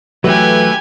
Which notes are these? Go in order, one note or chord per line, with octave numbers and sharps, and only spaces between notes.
E3 F#3 A3 G4 B4 G#5